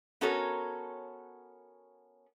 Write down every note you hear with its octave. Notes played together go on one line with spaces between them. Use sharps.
B3 C#4 F#4 A4 A#4 C#5